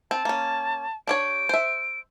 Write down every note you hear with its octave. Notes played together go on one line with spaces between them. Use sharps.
C4 A5
A#3 C#4
D4 G4 C#5 D7
C5 E5